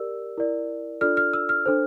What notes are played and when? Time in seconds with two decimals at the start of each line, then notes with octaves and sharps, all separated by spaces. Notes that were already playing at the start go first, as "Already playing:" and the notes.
Already playing: G4 A#4 D5 E6
0.38 E4 A#4 D5
1.01 D4 F4 A4 D5 F6
1.17 F6
1.33 E6
1.49 F6
1.66 D4 A4 C5